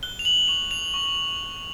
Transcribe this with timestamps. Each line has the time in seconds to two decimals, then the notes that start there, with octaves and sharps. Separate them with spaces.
0.03 F#6 G7
0.19 F7
0.25 F#7
0.48 C#6 F7
0.71 F7
0.94 C#6